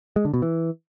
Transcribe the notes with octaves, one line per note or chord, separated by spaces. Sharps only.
G#3
D3
B2
E3